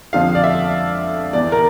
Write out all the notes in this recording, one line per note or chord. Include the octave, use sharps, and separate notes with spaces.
F2 D3 F3 F5
D5
E5
E2 E3 D5
A#4